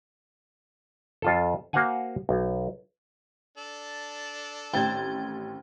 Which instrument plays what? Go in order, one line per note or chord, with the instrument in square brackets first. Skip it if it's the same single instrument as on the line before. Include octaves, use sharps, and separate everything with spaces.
[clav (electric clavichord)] F2 F4 A4
A#3 F#4 C5 F5 F#5 G#5
B1
[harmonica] D4 A4
[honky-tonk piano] A1 A6 [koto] D#3 C4 [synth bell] G5 G#6